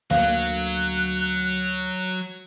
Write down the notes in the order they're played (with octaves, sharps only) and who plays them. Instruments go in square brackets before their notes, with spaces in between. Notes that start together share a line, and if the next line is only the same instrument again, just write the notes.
[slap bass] D2 A#3 [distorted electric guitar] F#3 [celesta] F5 [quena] F#6